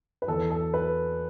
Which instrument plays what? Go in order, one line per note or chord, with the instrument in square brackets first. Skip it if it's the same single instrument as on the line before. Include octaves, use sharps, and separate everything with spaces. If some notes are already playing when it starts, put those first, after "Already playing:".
[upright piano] B4
E2 A4
A4
B4